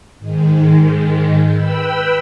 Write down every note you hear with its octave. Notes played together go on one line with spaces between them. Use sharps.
G#2 D#3 G#3
B4 G5 B5 E6